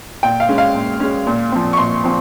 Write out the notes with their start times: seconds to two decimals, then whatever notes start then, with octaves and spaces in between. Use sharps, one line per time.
0.23 A#2 G5
0.40 F5
0.49 G#3 C#4
0.58 F5
0.74 A#2
1.00 G#3 C#4
1.27 A#2
1.52 F3 C4
1.73 C#6
1.77 A#2 C6
2.04 F3 C4